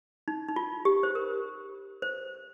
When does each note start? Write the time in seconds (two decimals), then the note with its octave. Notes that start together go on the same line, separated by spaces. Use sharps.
0.28 D#4
0.48 D#4
0.56 F4
0.85 G4
1.03 C5
1.15 A#4
2.02 C5